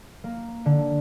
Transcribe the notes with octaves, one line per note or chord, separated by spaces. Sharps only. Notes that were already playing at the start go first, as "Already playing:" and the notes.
A#3
D3